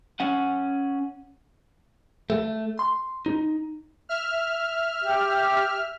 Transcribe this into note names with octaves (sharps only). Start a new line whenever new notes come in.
C#4 F#5
A3
C6
D#4
E5 F6
G4